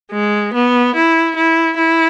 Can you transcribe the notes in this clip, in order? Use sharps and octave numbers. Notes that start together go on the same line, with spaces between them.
G#3
B3
E4
E4
E4